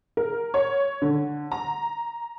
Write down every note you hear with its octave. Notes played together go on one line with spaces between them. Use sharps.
A#4
C#5
D3
A#5